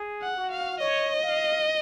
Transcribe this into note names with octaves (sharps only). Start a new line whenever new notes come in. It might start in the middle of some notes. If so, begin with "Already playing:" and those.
Already playing: G#4
F#5
F#4
F5
C#5 D#5
F5